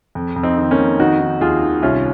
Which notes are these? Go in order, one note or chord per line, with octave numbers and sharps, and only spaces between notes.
F2
F2
C4 D#4
D#3
A#3 C#4
F2
D#3 D#4 F#4
D#3
D#2 F4 G#4
D#3
C2 C#4 F4